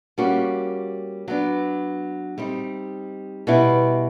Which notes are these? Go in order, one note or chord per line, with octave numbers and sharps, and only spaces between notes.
G3 A#3 C#4 F#4
F#3 B3 D4
G3 C4 D#4
B2 G3 B3 E4